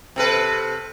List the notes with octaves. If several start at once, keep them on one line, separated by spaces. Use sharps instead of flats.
C3 A4 B4